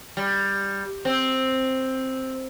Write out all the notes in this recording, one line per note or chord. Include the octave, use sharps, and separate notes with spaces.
G3
C4